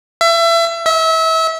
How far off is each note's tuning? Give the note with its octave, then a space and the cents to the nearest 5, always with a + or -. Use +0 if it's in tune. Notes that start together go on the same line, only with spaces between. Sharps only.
E5 +30
E5 -30